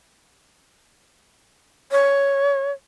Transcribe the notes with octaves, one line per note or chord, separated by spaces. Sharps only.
C#5